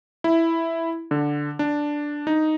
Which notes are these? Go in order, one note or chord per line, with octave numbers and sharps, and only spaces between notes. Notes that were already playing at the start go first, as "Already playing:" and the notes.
E4
D3
D4
D#4